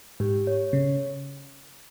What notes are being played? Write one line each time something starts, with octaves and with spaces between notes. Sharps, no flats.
G#2 G4
C#5
C#3 C#5